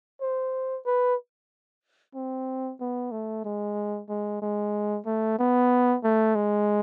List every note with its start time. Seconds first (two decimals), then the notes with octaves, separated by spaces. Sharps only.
0.21 C5
0.86 B4
2.15 C4
2.80 B3
3.12 A3
3.44 G#3
4.09 G#3
4.42 G#3
5.06 A3
5.39 B3
6.04 A3
6.35 G#3